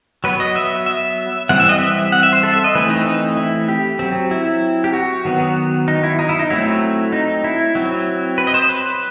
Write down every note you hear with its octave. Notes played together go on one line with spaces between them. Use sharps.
F#3 B3 B4
D#5
E5
E5
E3 G3 C4 F#5
E5
D#5
E5
F#5
E5
C5
A4
E5
D#5
E3 A3 C4 B4
D#4
D#4
E4
G4
F#3 C4
E4
G4
F#4
D#3 F#3 B3
D#4
E4
D#4
E4
D#4
F#3 A3 C4 E4
D#4
E4
F#3 C4
B4
D#5
C5
B4